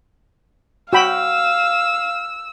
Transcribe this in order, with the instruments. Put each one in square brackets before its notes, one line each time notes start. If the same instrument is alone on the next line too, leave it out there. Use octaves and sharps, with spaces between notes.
[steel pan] F#4 G5 B5 [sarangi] F5 [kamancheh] E6